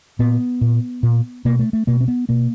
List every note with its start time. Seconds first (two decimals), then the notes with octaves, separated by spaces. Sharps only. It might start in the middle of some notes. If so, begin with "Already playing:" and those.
0.19 A#2 B3
0.61 A#2
1.03 A#2
1.45 B2 A#3
1.59 A3
1.73 A3
1.87 B2 A#3
2.01 C4
2.08 B3
2.29 B2 A#3